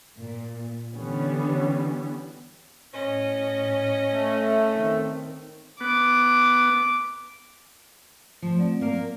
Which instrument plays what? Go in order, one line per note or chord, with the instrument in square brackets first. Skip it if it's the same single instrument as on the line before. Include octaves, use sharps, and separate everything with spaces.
[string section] A#2
D3 E3 G3 B3 C#4
[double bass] A2 [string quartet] C#4 D#5
[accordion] A3
[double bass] D#3 C4
[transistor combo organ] B3 [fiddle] D6
[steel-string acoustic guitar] F3 [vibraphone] A3
[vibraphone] F#3 C4 D5
[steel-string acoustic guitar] A#3 A#4